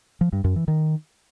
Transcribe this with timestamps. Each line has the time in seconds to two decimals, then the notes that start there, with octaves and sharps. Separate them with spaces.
0.21 F3
0.33 G2
0.44 F#2
0.56 E3
0.68 D#3